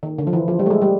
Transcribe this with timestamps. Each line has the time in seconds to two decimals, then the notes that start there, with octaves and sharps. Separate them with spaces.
0.03 D#3
0.18 D3
0.27 F3
0.33 E3
0.48 F3
0.59 G3
0.66 A3
0.70 G#3
0.82 G3